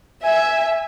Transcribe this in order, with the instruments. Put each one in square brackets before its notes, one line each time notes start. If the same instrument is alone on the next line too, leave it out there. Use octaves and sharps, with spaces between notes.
[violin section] E5 [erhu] G#5